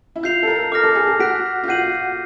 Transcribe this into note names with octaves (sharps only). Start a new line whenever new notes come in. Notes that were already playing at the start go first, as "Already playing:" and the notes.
E4
F4 G6 C7 F7
A4
A#4
A4 D6 F6 A#6
A4
G#4
G#4
F#4 F#6 B6 D7
F4
F#4 G6 C7 D#7 F#7